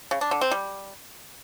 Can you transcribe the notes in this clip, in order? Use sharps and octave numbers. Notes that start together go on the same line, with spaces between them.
C#3
D4
D3
C4
G3